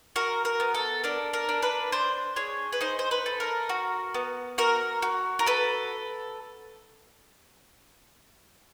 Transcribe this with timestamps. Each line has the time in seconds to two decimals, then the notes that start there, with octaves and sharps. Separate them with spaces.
0.16 F#4 A#4
0.45 A#4
0.60 B3
0.75 A4
1.04 D4 A#4
1.33 A#4
1.49 D4
1.62 B4
1.92 D4 C5
2.36 G#4 C#5
2.73 B4
2.81 D#4 C5
2.99 C5
3.11 B4
3.26 A4
3.40 A#4
3.69 F#4
4.14 B3
4.58 F#4 A#4
5.02 F#4
5.39 A#4
5.46 A4 B4